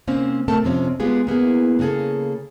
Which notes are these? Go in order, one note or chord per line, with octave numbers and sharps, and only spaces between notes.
C3 A#3 C4 C#4 C5
C3 A3 C4 A4 A#4 A5
F2 C3 F3 C4 C#4
G#3 B3 F4 G4 G#4
A#3 B3 E4 G#4
C#3 A#3 F#4 G#4 A4